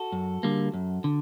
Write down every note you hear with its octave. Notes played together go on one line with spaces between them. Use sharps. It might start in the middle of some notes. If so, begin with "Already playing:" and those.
Already playing: F#4 A4
F#2
D3 G3 A#3
F#2
D3